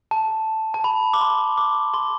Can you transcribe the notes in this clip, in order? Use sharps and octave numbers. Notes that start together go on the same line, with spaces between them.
A5
A5
B5
D6
C6
D6
C6